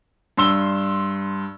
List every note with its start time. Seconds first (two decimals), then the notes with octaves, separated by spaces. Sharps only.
0.37 G2 C6 E6 G7